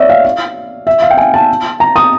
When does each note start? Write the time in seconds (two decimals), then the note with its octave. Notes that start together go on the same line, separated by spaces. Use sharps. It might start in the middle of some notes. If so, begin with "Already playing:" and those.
Already playing: C#5 D5 E5
0.10 F5
0.25 F5
0.87 E5
1.02 F5
1.10 G5
1.17 G#5
1.34 A5
1.80 A#5
1.96 D#6